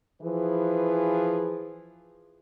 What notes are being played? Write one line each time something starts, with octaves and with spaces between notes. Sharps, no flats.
E3 F3 E4 G#4 B4